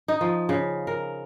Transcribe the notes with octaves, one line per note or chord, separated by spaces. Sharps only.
D#4
F3
C#3
A#4